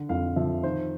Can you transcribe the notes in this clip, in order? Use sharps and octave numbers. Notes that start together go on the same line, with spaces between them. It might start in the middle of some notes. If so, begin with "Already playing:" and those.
Already playing: D3
F2 F5
F3 E5
D#3 C5